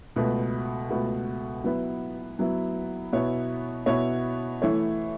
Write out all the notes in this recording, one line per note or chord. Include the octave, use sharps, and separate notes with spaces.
C#2 B2 A3 F#4 B4
C#2 B2 A3 F#4 B4
F#3 B3 E4 B4
F#3 B3 E4 B4
B2 B3 E4 C#5
B2 B3 E4 C#5
E3 A3 E4 C#5